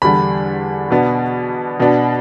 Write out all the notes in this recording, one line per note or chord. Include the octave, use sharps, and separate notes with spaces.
E2 D3 G3 D4 B5
B2 B3 D4
B2 B3 D4